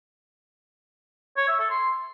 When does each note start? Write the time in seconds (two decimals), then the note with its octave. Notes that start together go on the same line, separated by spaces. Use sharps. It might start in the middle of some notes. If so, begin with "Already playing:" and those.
1.37 C#5
1.48 E5
1.59 A4
1.70 C6